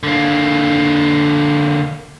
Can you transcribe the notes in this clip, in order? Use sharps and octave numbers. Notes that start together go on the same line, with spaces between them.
D3 A#3